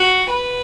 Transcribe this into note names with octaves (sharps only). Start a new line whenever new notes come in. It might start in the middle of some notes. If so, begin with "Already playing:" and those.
Already playing: F#4
B4